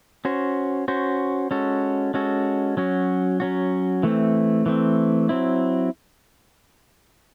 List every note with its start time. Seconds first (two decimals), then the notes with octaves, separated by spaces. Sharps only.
0.25 C#4 F#4 C5
0.88 C#4 F#4 C5
1.51 G#3 C#4 F#4 A4
2.14 G#3 C#4 F#4 A4
2.77 F#3 C#4 F#4
3.40 F#3 C#4 F#4
4.03 E3 A3 C4
4.66 E3 A3 C4
5.29 F#3 C4 E4